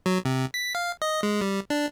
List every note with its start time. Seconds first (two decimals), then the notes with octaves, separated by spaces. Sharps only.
0.06 F#3
0.25 C3
0.54 B6
0.75 F5
1.02 D#5
1.23 G#3
1.41 G3
1.70 D4